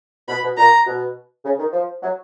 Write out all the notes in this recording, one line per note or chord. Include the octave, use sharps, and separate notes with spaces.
B2 B5
B2
A#2 A#5
B2
C#3
D#3
F3
F#3